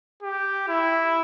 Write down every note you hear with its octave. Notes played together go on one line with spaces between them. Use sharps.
G4
E4